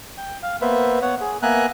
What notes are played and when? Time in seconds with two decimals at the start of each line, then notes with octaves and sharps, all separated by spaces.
0.17 G5
0.43 F5
0.61 A#3 B3 B4 C5 E5
1.02 B3 C#5 F#5
1.21 G#4
1.43 A#3 B3 E5 G#5 A#5 F#6